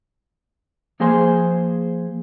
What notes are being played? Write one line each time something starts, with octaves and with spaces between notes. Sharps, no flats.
F3 A#3 G#4 C5 G#5 C6